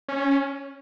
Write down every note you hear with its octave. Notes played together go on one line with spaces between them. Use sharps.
C#4